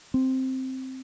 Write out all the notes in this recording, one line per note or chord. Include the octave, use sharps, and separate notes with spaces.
C4